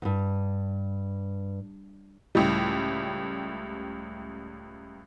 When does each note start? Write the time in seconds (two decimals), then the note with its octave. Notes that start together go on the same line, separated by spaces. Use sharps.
0.02 E2 G2
2.35 C#2 A2 G3